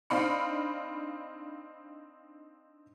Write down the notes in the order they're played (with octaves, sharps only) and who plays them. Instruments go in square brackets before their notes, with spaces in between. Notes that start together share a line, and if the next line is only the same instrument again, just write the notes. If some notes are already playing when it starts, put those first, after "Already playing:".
[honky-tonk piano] C4 D4 D#4 F5 B5 C#7